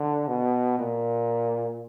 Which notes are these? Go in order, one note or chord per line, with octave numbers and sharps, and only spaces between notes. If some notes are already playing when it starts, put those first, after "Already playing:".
Already playing: D3
B2
A#2